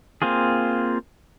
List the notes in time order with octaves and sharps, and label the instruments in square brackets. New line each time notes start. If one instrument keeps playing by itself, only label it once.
[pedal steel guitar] A#3 C4 F4 G#4